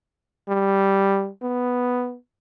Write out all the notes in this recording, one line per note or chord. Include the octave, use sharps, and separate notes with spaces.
G3
B3